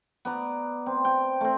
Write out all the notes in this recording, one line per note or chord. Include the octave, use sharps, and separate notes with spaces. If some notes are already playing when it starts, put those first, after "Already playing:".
B3 D5 A#5
C4
G5
A3 C4